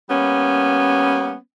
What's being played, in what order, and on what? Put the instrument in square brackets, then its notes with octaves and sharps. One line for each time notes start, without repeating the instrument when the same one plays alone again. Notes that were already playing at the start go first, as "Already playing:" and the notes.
[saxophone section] G3 A#3 B3 C#4